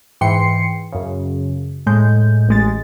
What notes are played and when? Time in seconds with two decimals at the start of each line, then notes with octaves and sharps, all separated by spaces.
0.21 G#2 E3 G5 C6 C7 C#7
0.93 F#2 C#3
1.87 A2 G#3 G6
2.48 A1 G#3 A6